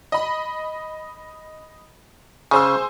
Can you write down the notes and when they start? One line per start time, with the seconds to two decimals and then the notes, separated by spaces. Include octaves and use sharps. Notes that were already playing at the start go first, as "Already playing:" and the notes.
0.12 D#5 B5
2.51 C#3 G#4 C5 E6